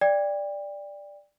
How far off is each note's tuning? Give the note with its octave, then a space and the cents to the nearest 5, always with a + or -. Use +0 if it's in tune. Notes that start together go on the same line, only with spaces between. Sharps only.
D5 +0 G5 +25